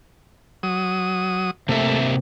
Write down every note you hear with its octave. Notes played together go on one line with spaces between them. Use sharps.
F#3 D#6
C3 A3 A#3 E5